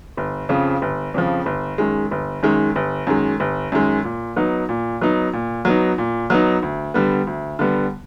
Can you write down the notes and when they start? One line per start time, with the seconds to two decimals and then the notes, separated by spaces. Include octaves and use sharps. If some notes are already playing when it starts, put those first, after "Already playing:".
0.17 G1
0.49 F2 C#3 F3
0.82 G1
1.14 F2 C#3 F3
1.46 G1
1.78 F#2 D#3 G#3
2.11 G1
2.43 F#2 D#3 G#3
2.76 G1
3.07 F#2 D#3 G#3
3.40 G1
3.72 F#2 D#3 G#3
4.04 A#2
4.36 F#3 B3 D#4
4.69 A#2
5.01 F#3 B3 D#4
5.33 A#2
5.65 F#3 B3 D#4
5.98 A#2
6.30 F#3 B3 D#4
6.63 D2
6.94 D3 G3 B3
7.27 D2
7.59 D3 G3 B3